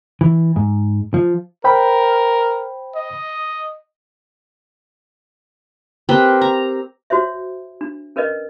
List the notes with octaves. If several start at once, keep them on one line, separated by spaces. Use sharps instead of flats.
E3
G#2
F3
A#4 C5 G5 B5
D#5
C4 G4 A#4 B4
A#5
F#4 C5 C#5 E5
D4
C#4 A#4 B4 D5 D#5